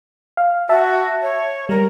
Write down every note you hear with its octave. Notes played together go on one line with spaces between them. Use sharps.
F5
F#4 E5 A5
C#5
G3 A#4